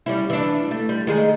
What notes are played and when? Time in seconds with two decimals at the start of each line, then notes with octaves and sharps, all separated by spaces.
0.06 G3 C#4 E4
0.30 E3 D4
0.71 A3
0.89 G3
1.07 D#3 G#3 G#4